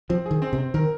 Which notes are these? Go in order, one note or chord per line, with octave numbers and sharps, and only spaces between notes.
F3 C4
D#3 G#4
C4
C3
C4
D#3 A#4